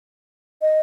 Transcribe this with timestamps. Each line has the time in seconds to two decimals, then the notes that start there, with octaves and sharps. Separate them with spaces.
0.62 D#5